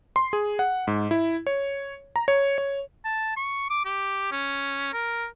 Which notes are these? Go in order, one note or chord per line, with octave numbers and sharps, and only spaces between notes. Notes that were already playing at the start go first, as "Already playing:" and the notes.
C6
G#4
F#5
G#2
E4
C#5
A#5
C#5
C#5
A5
C#6
D6
G4
C#4
A#4